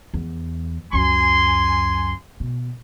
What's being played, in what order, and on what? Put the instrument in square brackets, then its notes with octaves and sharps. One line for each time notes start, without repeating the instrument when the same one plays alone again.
[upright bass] E2
[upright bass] C#2 F#2 [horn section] G#5 C6
[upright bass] B2